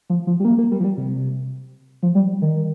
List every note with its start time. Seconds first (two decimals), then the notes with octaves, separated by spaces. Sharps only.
0.10 F3
0.27 F3
0.40 G3
0.45 A#3
0.58 A#3
0.71 G3
0.80 F3
0.84 G3
0.97 C3
2.03 F3
2.15 G3
2.42 D#3